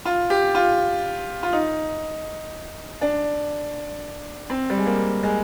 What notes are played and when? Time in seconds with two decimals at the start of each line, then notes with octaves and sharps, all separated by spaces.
0.05 F4
0.30 G4
0.55 F4
1.43 F4
1.53 D#4
3.01 D4
4.50 C4
4.70 G3
4.78 G#3
4.86 A#3
5.23 G#3